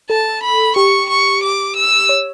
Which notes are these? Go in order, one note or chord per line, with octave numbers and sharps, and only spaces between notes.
A4 A5
B5
G4 C#6
C#6
D6
E6
C#5